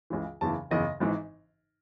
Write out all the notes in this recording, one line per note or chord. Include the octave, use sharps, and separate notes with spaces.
C#2 C#3 E3
F#1 E2 C#3 E3 A5
F#1 E2 C#3 E3 D#5
G#1 G#2 E3